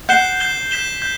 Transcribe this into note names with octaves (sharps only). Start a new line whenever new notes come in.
F#5 G6 C7 E7 G7
G6 C7 E7 G7
G6 B6 E7 G7
G6